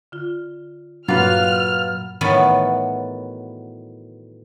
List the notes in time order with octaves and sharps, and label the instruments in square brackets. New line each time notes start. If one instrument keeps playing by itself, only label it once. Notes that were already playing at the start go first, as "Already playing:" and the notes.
[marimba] D3 F4
[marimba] G2 A#2 A#3 [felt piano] F#3 [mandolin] F4 B4 [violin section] F6
[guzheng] A2 D#3 E3 F#3 A3 B3